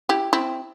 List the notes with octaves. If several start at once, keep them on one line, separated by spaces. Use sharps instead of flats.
E4 G4
C4 E4